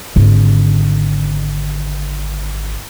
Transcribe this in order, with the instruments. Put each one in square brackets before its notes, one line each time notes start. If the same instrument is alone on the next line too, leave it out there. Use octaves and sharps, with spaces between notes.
[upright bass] G#1 D3